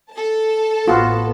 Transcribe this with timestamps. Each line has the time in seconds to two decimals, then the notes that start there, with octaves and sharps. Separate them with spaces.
0.12 A4 A5
0.88 A1 B3 F4 F#4